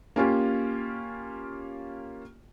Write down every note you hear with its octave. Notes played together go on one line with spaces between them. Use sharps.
A#3 C#4 F4 G4